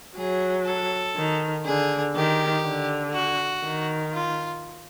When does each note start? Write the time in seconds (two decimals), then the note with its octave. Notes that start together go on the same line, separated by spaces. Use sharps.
0.16 F#3 G#4
0.66 A4
1.16 D#3
1.65 D3 G#4
2.16 D#3 G4
2.65 D3
3.14 F#4
3.64 D#3
4.14 F4